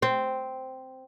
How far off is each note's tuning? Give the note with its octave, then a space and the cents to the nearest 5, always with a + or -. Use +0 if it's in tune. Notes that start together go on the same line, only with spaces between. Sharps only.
C4 -5